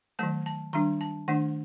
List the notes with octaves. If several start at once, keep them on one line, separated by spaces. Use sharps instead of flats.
D#3 F#3 A3 A5
A5
D#3 G3 D4 A#5
A5
D#3 A3 D4 F#5